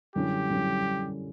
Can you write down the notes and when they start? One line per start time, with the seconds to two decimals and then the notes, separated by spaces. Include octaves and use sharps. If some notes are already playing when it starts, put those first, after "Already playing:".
0.15 F#2 D3 G3 C#4 E4 G4
0.50 F#2 D3 G3 C#4 E4